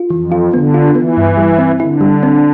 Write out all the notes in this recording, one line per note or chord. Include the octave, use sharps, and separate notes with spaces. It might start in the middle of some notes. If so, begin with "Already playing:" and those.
Already playing: F4
F2 E3
F4
D3 B3
F4
E3 B3
G2
G3
C4
D3 E4
G3
C4